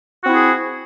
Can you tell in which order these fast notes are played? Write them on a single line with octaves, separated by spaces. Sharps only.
F#4 C4 E4 G#4